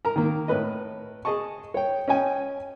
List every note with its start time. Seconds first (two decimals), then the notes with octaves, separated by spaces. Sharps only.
0.05 A#4 A#5
0.16 D#3 A#3
0.48 A2 A#4 B4 D#5
1.25 G#4 D#5 A5 C#6
1.74 C#5 G5
2.08 C#4 D#5 G5 G#5